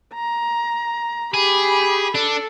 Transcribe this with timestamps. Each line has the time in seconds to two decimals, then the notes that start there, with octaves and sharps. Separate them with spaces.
0.14 A#5
1.34 G4 G#4 B5
2.15 D4 A4